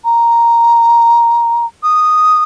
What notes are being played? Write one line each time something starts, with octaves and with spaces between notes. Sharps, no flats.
A#5
D#6